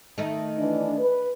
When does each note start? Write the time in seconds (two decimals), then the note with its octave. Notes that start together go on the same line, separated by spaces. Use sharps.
0.18 D#3 A3 D#4
0.59 E3 D4
0.99 B4